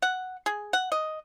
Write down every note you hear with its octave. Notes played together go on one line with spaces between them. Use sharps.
F#5
G#4
F#5
D#5